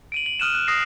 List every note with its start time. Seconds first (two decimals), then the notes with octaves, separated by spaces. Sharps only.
0.12 D7 D#7 F#7
0.26 F#7
0.40 D#6 F6 F#6 D#7 E7
0.55 F#6
0.68 D#6 A#6 C7